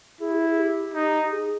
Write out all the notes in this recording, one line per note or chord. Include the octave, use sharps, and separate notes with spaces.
E4 G#4
G4
G#4
G#4
G4
D#4
G#4